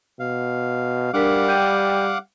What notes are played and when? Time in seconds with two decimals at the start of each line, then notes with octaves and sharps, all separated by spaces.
0.20 B2 F5
1.14 G3 D4 A#4 F5 F#5 D6 B6
1.47 G5 G6 D#7